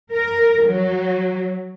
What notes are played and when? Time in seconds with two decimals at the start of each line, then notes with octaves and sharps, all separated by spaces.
0.12 A#4
0.63 F#3